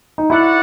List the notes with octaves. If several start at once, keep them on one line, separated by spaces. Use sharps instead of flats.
D#4
E4 F#4 A4 D5 F#5